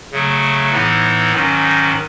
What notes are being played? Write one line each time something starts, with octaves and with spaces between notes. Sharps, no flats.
C#3 F#3 A3
A2 E3 B3 D#4
G#2 D#3 F#3 C#4